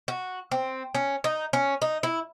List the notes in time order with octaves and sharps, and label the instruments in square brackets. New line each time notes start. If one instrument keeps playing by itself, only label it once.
[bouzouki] F#4
C4
C#4
D#4
C#4
D#4
E4